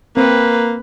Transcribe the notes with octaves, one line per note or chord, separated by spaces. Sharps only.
A#3 C4 B4